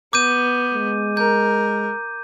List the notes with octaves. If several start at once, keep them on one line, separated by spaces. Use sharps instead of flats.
B3 D6 G6 D#7
G#3
A#4 G6